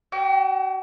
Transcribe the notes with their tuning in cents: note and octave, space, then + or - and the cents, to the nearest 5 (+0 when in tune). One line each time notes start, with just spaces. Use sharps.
F#4 +40 G5 +0